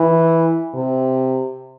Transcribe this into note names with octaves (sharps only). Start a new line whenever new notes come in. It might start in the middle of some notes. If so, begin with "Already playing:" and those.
Already playing: E3
C3